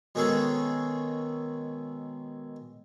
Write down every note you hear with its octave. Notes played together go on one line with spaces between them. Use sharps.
B2 D#3 G#3 C#4 G#4 A4